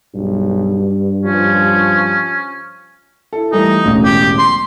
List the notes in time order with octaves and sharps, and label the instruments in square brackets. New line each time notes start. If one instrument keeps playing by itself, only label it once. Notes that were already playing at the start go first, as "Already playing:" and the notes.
[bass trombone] B1 [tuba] G2
[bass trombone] F3 [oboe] C#4
[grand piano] E4 A4
[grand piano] E3 G3 A3 [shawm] D#4
[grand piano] E1 A1 C#3
[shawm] G4
C6